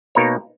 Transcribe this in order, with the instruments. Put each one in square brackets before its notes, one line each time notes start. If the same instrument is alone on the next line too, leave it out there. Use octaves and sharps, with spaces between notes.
[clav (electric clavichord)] B2 A#3 D#4 A#4 C#5